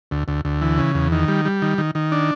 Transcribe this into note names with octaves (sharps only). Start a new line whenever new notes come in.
D2
D2
D2
E3
C#3
E2
D#3
G3
G3
D#3
D#3
D#3
D4